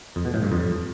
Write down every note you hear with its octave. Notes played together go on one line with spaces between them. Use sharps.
F2
B2
A2
G2
F2